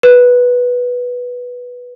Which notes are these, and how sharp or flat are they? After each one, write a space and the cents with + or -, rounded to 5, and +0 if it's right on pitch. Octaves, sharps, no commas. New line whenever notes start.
B4 -10